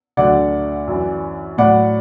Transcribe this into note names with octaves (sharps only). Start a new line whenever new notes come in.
D2 D3 F#3 D5 F#5
F#2 E3
A2 F#3 D5 F#5